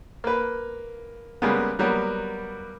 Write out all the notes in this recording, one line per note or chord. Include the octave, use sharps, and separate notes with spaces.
A#3 B4
C#3 G3 G#3 A#3 B3
F#3 G3 A#3 B3